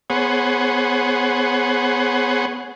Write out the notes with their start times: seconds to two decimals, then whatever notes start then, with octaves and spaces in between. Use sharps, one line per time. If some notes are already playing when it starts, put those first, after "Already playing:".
0.10 B3 G#4 C5 C#5 F#5